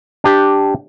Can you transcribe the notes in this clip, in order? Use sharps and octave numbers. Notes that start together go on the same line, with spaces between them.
D4 G4